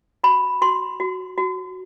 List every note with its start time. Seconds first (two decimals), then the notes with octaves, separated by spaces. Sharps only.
0.24 F#4 B5
0.62 F#4 C6
1.00 F#4
1.38 F#4